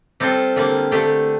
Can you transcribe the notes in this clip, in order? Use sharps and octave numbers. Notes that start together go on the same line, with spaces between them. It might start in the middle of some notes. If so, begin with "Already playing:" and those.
G3 C4 F4 A4 C5
D3 G3 A#3
D3 A3 D4 G4